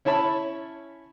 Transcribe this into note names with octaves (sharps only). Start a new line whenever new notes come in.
C#4 E4 C#5 A5 B5